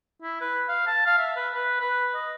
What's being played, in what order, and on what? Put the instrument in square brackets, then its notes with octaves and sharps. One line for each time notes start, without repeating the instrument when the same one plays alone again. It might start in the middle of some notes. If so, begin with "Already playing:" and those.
[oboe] E4
B4
F5
A5
F5
E5
B4
B4
B4
D#5